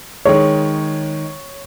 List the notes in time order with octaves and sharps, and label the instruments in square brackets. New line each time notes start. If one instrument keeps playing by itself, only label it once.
[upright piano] D#3 G#3 [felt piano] C#5